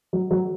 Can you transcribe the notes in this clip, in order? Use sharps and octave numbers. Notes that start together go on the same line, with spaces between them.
F#3
F#3